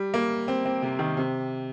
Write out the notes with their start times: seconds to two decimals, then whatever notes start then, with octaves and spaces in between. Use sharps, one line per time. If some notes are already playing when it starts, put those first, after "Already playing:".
Already playing: G3
0.14 A#3
0.48 C4
0.66 C4
0.82 C3
0.99 D#3
1.17 C3